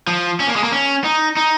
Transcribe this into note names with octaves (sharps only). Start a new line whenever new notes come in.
F3
C#4
A#3
G#3
A#3
C#4
D#4
D#4